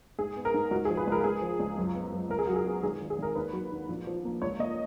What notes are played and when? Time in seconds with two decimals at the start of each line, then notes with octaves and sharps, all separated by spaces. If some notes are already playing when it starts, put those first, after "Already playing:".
0.19 G#2 G#4
0.36 B3
0.45 A#4
0.54 G#2
0.71 C#2 F#4
0.85 G#4
0.89 F3
0.97 B4
1.07 C#2 A#4
1.24 C#2 G#4
1.41 F3
1.60 C#2
1.78 F#2
1.95 B3
2.12 F#2
2.30 C#2 A#4
2.39 G#4
2.47 F#3 F#4
2.56 G#4
2.66 B3
2.83 G#1 G#4
3.01 D#3
3.10 G#4
3.18 G#1 A#4
3.35 D#2 B4
3.53 F#3
3.72 D#2
3.88 A#1
4.07 F3
4.25 A#3
4.42 C#2 C#5
4.59 A#3 D#5